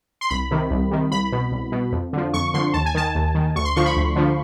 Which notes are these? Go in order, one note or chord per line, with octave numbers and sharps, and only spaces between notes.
C6
C2 B5
C3 D#3
C2
C3 D#3
C2 B5
B2
C2
B2
F2
D3 F3
F2 C#6
D3 F3 C6
D#2 A5
G#5
D#3 A5
D#2
D#3
D2 C#6
C6
D3 F3 C#6
B5
D2
D3 F3